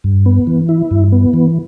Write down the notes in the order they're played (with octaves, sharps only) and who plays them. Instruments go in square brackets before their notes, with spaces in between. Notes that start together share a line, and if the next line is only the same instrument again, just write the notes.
[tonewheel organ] G2
B3
E3
E4
G2
B3
E3